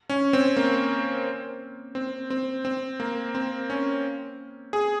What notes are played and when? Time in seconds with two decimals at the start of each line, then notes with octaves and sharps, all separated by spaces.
0.10 C#4
0.33 C4
0.56 A#3
1.95 C4
2.30 C4
2.65 C4
3.00 A#3
3.35 C4
3.70 C#4
4.73 G#4